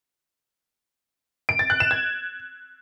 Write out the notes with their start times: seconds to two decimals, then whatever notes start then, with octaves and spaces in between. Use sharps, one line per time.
1.49 D7
1.59 A6
1.70 F#6
1.80 E7
1.91 G#6